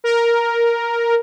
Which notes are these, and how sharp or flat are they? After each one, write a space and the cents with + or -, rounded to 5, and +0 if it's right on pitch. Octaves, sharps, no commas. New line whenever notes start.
A#4 +5